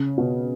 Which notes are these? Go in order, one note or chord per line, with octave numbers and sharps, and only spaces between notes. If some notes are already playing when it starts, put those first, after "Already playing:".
Already playing: C#3
B2